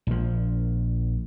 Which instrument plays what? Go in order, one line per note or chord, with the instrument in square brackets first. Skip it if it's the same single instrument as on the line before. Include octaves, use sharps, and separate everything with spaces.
[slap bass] A#1 F3